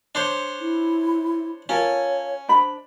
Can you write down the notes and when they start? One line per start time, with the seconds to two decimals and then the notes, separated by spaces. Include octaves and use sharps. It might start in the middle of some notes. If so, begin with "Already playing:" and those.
0.15 D4 C5 C#5
0.60 E4
1.69 C#4 F4 A4 A#4 C#5
2.48 D4 C5 B5